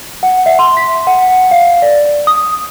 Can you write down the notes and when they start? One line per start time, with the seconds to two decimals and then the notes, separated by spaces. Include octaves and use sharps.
0.23 F#5
0.46 E5
0.59 C6
0.77 B6
1.07 F#5
1.51 F5
1.82 D5
2.27 D#6